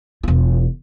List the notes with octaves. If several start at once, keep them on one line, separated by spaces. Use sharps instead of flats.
E1 F4